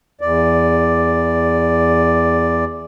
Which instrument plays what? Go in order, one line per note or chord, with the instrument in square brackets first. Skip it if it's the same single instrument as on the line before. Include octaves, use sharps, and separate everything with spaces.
[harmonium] E2 D5